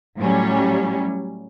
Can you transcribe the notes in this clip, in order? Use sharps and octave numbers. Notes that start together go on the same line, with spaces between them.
A2 F#3 G3 C#4